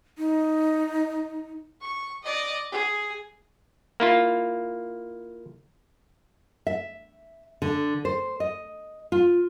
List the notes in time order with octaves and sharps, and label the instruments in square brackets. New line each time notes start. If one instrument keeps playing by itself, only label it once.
[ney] D#4
[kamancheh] C#6
D5 D#5
G#4
[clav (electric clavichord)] A#3 E4 F4
[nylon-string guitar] E5
D3
C5
D#5
F4